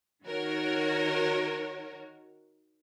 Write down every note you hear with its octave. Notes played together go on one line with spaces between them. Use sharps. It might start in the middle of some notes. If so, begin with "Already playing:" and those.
D#3 F#4 A#4 C#5